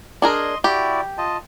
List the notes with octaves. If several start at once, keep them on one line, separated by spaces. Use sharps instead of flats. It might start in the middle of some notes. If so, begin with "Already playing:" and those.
D4 G#4 A#4 D#5 C6
E4 F#4 G4 D5
F4 D#5 A5